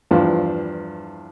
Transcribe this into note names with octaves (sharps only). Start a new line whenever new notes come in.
E2 G2 F3